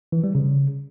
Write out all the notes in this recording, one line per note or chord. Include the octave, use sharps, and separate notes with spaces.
E3
G3
C#3